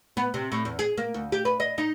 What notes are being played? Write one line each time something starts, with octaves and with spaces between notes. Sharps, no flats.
B3
C3
A2
E2
G#4
A#3
D2
G4
B4
D#5
D#4